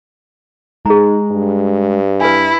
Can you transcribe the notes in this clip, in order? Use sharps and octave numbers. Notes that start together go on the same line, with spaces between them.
G#3 D#4 G#4 A#5
G2
E4 B4 G#5